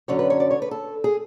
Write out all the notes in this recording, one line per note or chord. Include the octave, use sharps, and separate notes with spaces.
F#2 D3 F#3 C#4 C#5
B4
C#5
D5
C#5
B4
A4
G#4